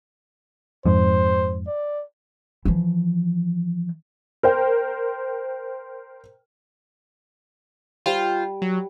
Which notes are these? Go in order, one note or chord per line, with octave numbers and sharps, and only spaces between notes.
F2 G#2 C5
D5
E3 F3
A#4 C5 G5
G3 F4 C5
F#3